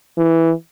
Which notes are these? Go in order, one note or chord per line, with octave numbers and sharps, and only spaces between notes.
E3